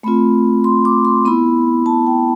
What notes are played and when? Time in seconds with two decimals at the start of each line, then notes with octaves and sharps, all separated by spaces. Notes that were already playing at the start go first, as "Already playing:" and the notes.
0.03 A3 C4 F4 B5
0.64 C6
0.85 D6
1.05 C6
1.25 B3 E4 B5
1.86 A5
2.07 G5